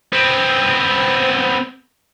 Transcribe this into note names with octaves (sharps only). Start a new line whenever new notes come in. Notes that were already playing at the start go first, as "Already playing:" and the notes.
B3 C4